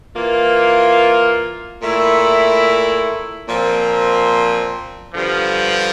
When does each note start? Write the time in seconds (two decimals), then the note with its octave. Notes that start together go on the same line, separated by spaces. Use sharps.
0.15 E3 A#3 F4
1.81 A#2 A3 E4
3.48 A#2 F3 C4
5.13 G2 D3 F3